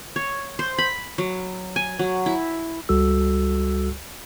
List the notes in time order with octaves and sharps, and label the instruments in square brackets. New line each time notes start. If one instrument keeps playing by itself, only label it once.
[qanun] C#5
C5
B5
F#3
G#5
F#3
E4
[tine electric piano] C#2 G3 F#4 A4 E6